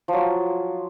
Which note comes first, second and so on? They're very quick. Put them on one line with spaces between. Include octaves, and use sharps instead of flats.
F3 F#3 F4